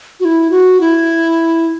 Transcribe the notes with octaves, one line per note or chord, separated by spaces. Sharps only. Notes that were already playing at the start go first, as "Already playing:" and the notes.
F#4
E4
F#4
E4